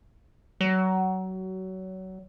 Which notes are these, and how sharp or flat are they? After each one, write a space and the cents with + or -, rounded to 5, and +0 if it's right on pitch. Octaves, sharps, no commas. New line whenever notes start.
F#3 +25